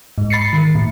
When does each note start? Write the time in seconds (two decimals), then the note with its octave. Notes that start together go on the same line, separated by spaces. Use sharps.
0.18 G#2
0.30 B5 A6 C7 C#7
0.53 D#3
0.75 A2